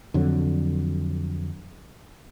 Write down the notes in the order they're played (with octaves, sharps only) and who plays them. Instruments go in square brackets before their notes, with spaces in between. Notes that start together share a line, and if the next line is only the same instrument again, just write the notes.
[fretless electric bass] F2 D3 F#3